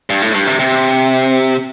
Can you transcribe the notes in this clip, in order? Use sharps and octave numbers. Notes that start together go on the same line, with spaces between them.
G2
A2
G2
C3
C3